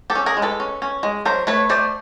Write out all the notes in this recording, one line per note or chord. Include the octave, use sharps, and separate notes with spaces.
G4 A4
C#4
G#4 A#4
G#3
A4 B4
C#4
C#4
G#3
F#3 A#4 C5
A3 B4 C#5
A3 C5 D5